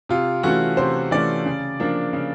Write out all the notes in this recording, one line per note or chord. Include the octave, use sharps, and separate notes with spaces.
C3 F4
E3 A3 C#4 F#4
C3 C5
E3 A3 C#4 D5
C#3
F3 A#3 D4
C#3